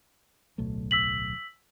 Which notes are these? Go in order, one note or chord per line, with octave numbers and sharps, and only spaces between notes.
D1 B1 A3
E6 B6 F#7